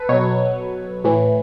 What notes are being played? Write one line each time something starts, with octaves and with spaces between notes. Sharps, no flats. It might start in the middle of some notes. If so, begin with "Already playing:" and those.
Already playing: A4 B4
B2 F#3 C#5
A2 E3